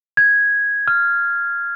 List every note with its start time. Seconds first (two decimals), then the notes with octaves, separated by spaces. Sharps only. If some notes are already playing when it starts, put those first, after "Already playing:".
0.17 G#6
0.88 F6